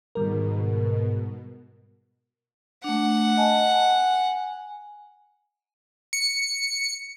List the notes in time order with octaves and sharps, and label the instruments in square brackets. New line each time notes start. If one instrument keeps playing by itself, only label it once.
[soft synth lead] G#2 [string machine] B2 [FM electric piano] D#3 G3 A#4
[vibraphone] A3 D4 [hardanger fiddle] F#5
[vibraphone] D#5 G#5 A5
G#5
[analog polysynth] C#7